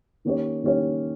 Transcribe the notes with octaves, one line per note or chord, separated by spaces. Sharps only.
D#3 A#3 C#4 G4 C#5
D#3 A#3 C#4 G4 C#5